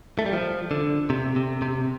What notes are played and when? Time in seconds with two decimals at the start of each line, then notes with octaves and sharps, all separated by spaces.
0.19 A3
0.26 G3
0.33 F3
0.71 D3
1.10 C3
1.36 C3
1.62 C3